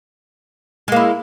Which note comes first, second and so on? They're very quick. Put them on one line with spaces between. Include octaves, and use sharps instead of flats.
G#3 A#3 E4